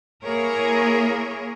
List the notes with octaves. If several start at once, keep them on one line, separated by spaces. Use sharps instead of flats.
A#3 E4 G#4 A#4 C#5